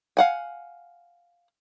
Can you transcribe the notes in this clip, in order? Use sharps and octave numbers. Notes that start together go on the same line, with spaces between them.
F5 F#5 G#5